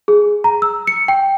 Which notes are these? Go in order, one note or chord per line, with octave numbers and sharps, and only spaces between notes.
G#4
A#5
E6
C#7
G5